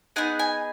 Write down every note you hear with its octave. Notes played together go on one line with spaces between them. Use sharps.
B3 D#4 G#4 F#5
G#5